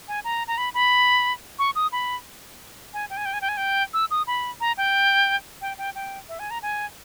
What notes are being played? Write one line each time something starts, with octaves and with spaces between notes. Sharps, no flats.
G#5
A#5
A#5
B5
B5
C#6
D#6
B5
G#5
G5
G#5
G5
G#5
G5
G#5
G5
E6
D#6
B5
A#5
G5
G5
G5
G5
E5
G#5
A#5
G#5